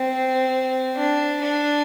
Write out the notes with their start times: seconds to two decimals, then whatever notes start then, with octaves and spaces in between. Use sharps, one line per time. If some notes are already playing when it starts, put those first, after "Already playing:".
Already playing: C4
0.97 D4
1.42 D4